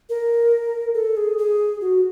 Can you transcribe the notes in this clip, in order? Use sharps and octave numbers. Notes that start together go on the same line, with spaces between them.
A#4
A4
G#4
G#4
F#4